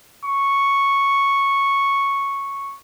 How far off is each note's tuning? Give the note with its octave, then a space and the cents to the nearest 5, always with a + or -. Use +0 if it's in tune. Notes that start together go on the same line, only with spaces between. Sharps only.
C#6 -5